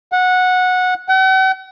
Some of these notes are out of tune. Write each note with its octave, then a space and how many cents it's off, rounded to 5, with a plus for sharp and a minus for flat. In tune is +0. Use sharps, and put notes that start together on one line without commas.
F#5 -15
F#5 +45